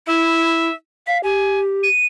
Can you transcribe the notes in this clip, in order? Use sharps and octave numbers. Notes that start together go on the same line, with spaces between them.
E4 E5
F5 B6
G4 G#5
D#7